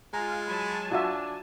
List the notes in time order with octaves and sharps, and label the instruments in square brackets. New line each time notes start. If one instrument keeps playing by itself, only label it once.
[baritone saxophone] G#3 [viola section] F4 F5 [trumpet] G#5 [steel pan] A#5
[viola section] F#3 G#5 A5 [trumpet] B5
[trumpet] D4 [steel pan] F4 F#4 E5